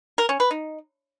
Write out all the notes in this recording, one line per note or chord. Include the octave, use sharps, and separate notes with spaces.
A#4
C#4
B4
D#4